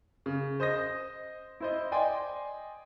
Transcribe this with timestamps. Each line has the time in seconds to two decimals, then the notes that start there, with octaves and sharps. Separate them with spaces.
0.26 C#3
0.60 C5 D#5 D#6 A#6
1.60 E4 C5 D#5
1.92 D5 D#5 G5 G#5 C6